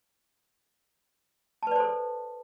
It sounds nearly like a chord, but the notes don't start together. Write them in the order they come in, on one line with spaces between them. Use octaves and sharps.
A5 B4 D5 C5 A4